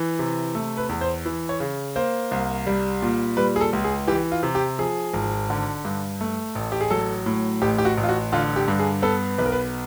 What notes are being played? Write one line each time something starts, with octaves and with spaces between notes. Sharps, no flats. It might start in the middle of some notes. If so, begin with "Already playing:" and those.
Already playing: E3
C3
A3
B4
E2
C5
E3
C#5
C#3
A#3 C5
C2
G3
A#2
G3 B4
G#4
A4
C#2
G#4
E3 G4
F4
C3
G4
F3 G#4
G#1
D3
G2
A3
A1
G4
G#4
F#3 A4
A2
A1 G4
G4
F#4
A1
F4
F#4
D3 F4
G4
G2
G#4
B3 A4
B1 B4
A#4
B4